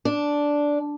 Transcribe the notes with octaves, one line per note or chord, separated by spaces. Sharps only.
D4